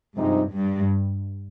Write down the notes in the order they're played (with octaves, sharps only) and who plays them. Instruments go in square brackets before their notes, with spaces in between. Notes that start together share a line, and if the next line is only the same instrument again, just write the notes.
[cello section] G2 [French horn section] C3 F3 G#3 D#4
[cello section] G2